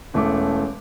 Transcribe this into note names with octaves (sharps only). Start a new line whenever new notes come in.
E1 A3 C#4 D6